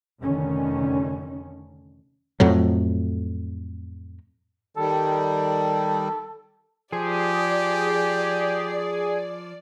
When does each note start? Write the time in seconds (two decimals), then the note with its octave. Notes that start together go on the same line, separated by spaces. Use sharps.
0.22 F1 D3 D#3 C#4
2.40 F2 A2 F#3
4.77 D#3 G3 A4
6.92 F3 G4 G#4 D5